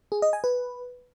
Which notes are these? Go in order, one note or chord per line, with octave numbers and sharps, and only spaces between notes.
G#4
D#5
G#5
B4